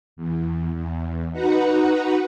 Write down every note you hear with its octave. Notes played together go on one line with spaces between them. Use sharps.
E2
E2
D#4 F#4 B4 F#5 A#5